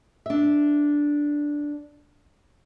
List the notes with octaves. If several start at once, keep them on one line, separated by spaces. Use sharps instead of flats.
D4 E5